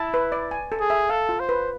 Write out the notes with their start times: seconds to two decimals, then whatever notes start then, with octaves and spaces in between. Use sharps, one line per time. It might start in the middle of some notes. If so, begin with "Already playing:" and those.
Already playing: E4 A5
0.14 B4
0.32 D5
0.51 G#5
0.72 A4
0.81 G#4
0.90 E5
1.09 A4 F5
1.29 F4
1.40 C5
1.49 B4